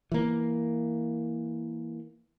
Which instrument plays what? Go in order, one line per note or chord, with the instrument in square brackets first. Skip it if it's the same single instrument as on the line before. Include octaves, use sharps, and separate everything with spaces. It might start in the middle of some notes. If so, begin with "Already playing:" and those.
[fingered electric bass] E3 A#3